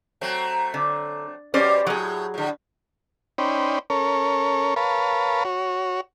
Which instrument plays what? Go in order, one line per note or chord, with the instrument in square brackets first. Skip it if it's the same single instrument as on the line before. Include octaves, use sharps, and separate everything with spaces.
[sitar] F#3 A3 C4
[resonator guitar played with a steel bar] D3
[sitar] B2 G3 [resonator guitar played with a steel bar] C#4 C5 D5
[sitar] A2 [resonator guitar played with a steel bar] F#3 G#4
[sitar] A2 D3
[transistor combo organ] C#4 D#4 C5 D5 G5 B5
C#4 A4 A#4 C#5
A#4 B4 C#5 F5 A5 B5
F#4 C#5